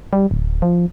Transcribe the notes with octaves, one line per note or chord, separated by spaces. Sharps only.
G3
D1
F3